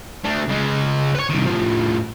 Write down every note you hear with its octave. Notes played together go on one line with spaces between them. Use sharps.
A3 D4
C#3 G#3
B4 C#5
C2 D#3
A2 F3